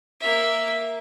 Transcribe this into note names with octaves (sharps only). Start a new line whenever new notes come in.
A#3 E5